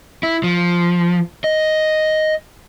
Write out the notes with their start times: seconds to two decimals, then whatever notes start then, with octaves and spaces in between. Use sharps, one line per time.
0.23 E4
0.43 F3
1.44 D#5